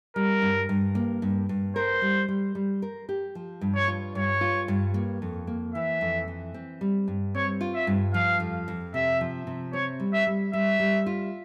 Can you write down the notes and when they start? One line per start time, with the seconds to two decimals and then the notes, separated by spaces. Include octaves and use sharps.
0.16 G3 A#4
0.42 G2
0.69 G2
0.95 A#3
1.22 G2
1.49 G2
1.76 A#4 C5
2.02 G3
2.28 G3
2.55 G3
2.82 A#4
3.09 G4
3.35 F3
3.61 G2
3.75 C#5
3.88 F4
4.15 G2 C#5
4.41 F4
4.68 G2
4.94 A#3
5.22 F2
5.47 A#3
5.74 E3 E5
6.01 F2
6.28 E3
6.54 C4
6.81 G3
7.08 G2
7.35 C4 C#5
7.61 F4
7.75 E5
7.87 G2
8.14 F3 F5
8.40 F2
8.68 F2
8.94 C3 E5
9.21 F3
9.47 C3
9.73 C4 C#5
10.00 G3
10.13 E5
10.27 G3
10.53 G3 E5
10.79 G3
11.06 F4